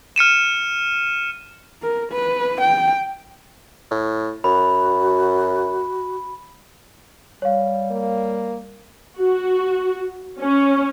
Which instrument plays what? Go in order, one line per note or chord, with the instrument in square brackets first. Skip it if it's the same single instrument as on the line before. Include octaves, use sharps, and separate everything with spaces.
[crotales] F6 C#7 D#7 E7
[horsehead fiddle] A#4
B4
G5
[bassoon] A2
[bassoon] F#2 [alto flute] F#4 [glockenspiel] B5
[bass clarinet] G3 [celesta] C#5 F5
[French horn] A#3
[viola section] F#4
C#4